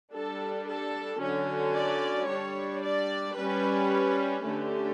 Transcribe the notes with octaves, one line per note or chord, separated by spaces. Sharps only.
G3 D4 A4
A4
D3 F#3 C#4
D5
G3 D4 C#5
D5
G3 C#4 B4
D3 A3 C#4 G4